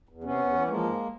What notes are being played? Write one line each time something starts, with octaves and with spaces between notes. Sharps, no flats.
E2
C3 B3 C#4
E2
E3
F3 G#3 A#3
G#2